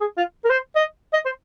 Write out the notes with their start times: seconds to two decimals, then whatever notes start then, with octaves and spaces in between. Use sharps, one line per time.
0.01 G#4
0.18 F4
0.44 A#4
0.50 C5
0.76 D#5
1.13 D#5
1.25 C5